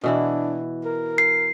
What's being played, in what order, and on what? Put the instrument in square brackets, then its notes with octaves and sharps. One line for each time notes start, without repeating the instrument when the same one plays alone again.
[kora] B2 E3 E4 [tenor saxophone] D4
[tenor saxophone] A#4
[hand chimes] C7